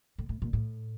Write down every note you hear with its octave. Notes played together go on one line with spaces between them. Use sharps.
A2
A2
A#2
A2